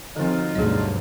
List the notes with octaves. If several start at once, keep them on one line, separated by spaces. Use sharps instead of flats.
D3 F3 F#3 C4 D#4 F4
D2 G2 B2 F#3 G#4 D#5